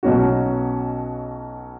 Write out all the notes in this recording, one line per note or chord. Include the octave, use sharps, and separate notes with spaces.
B1 B2 F#3 C#4 F#4